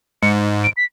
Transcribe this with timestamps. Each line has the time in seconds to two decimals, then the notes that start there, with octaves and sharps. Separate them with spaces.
0.22 G#2 C#7
0.64 D7
0.77 B6